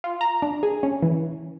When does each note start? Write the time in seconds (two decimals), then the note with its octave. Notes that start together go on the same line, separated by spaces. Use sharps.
0.04 F4
0.21 A#5
0.42 D4
0.63 G#4
0.83 C#4
1.02 E3